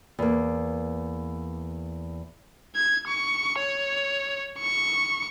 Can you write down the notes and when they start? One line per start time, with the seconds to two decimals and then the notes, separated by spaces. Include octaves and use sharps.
0.19 E2 A#3
2.76 G#6
3.08 C#6
3.60 C#5
4.59 C#6